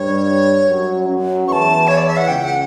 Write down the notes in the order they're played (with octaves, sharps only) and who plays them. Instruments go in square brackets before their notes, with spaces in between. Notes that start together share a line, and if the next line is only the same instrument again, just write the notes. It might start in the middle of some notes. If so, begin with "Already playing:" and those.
Already playing: [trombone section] G2 G3 [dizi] C#5
[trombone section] F#2 F#3
F#2 F#3
[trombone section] E2 E3 [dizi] A5 C#6
[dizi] C#5
D5
E5
F#5
[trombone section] C#2 C#3 [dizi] G5
[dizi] F#5